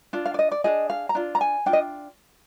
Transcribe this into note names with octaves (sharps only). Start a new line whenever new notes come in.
D4 F4
F5
D5
D#5
D5
D4 F4 G#4 D#5
F5
A#5
D4 F4
A#5
G#5
D4 F4 G5
D#5